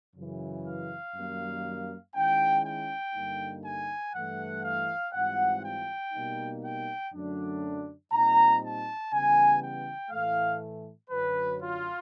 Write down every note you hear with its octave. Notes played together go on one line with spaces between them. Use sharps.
F#2 C#3 E3
F5
F#2 D#3 G3 A#3
D#3 G#3 C#4 E4 G5
G5
G2 D3 G3 A#3 D#4
G#5
G2 E3 A3 F#5
F5
G#2 E3 G3 C4 F4 F#5
G5
B2 G3 A#3 D#4
G5
F#2 D3 F#3 A3 D4
A#2 G3 C4 D#4 A#5
A5
C#3 E3 G3 B3 G#5
G5
A2 E3 A3 F5
F#2 D3 F#3 B4
F4